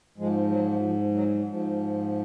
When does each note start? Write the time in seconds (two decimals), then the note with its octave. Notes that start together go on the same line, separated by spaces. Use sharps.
0.18 G#2 F3 G#3
0.51 F#3
0.82 F3
1.14 F#3
1.47 G#2 F3